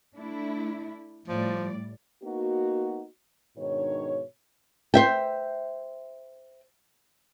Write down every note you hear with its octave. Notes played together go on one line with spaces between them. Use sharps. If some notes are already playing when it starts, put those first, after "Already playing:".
A3 D4 E4
A2 F3 G3 D5
A#3 B3 D#4 F#4
G#2 B2 D#3 D4 C#5
C5 E5 G5